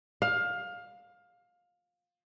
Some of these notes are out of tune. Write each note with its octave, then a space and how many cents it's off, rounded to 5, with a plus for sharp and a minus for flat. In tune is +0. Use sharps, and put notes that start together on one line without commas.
F5 +20